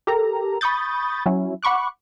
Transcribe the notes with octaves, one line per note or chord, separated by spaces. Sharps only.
G4 A4 A#4 A#5
B5 C#6 D#6 G6 A6
F#3 C#4 E4
F#5 B5 C#6 D6 F#6